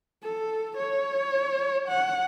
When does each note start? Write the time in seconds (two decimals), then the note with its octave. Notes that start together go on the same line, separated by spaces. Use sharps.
0.23 A4
0.77 C#5
1.88 F#5